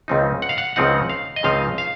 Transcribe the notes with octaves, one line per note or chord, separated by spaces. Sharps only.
C#2 C#3 F3 C4 D#4
F#5
F5
F#5
C#2 C#3 F3 C4 D#4 F#5
F5
D#5
C#2 C#3 F3 C4 D#4 F5
F5